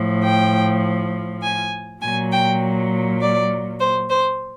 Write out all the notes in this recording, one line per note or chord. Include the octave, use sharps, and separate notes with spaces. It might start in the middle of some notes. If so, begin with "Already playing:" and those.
Already playing: A2 F3
G5
G#5
A#2 F#3 G#5
G5
D5
C5
C5